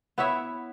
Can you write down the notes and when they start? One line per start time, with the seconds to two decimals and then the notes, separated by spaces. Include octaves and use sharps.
0.18 B3 E4 C#5 E5